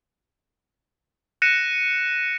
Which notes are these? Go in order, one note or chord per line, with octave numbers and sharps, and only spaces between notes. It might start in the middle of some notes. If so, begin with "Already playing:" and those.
F#6 A#6 C#7 D#7 E7